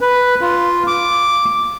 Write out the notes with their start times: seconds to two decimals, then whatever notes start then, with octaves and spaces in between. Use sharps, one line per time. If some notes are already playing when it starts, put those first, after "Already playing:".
0.01 B4
0.41 F4
0.87 D6